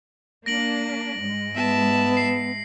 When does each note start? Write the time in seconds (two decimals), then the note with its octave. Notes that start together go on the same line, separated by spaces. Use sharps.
0.46 A#3 D4 A#6 D7 F#7
1.21 G#2 G#3
1.55 B3 E5 A5
2.17 C7